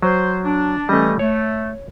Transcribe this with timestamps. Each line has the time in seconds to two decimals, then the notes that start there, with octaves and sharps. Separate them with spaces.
0.02 F#3 C5
0.44 D4
0.89 E3 G3 A3 C#4 D#5
1.19 A3 C#5